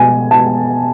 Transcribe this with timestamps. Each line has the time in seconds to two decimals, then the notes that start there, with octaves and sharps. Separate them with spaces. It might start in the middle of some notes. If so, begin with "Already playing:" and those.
Already playing: B2 G#3 G#5
0.31 A5